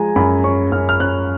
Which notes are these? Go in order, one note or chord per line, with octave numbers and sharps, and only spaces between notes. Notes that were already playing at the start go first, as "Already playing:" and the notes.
Already playing: F3 G#3 G#5 A#5
F#2 B5
C#4 C#6
F#2 F6
F6
C#4 F#6